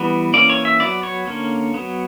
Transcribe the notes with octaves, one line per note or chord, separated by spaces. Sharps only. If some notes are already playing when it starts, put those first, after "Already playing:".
Already playing: E3 G3 B3
E3 A#3 C#4 D5
C#5
E5
F#3 B3 D5
C#5
D3 A#3 C#4
F#3 B3